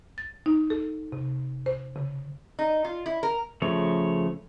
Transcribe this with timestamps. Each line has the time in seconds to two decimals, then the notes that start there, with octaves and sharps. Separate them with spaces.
0.18 A6
0.46 D#4
0.70 A4
1.12 C3
1.66 C5
1.96 C#3
2.59 D#4
2.85 F4
3.06 E4
3.23 A#4
3.62 C#3 F3 A3 C#5